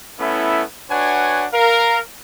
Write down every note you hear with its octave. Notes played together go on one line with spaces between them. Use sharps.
A3 B3 C#4 E4
D4 F#4 B4 C#5 F#5 G#5
A#4 F5